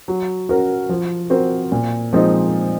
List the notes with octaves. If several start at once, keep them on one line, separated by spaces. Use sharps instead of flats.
F#3
C#4 F#4 A#4
F3
C4 F#4 A#4
A#2
F3 G#3 C4 D#4